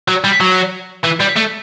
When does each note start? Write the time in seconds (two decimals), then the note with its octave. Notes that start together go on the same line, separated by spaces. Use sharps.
0.08 F#3
0.24 G3
0.40 F#3
1.04 E3
1.21 G3
1.37 A3